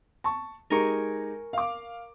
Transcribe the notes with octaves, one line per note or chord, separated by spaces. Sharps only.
A5 C#6
G#3 D#4 G4 A#4 G#5 C#6
F5 D6